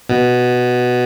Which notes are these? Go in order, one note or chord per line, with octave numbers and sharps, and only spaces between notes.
B2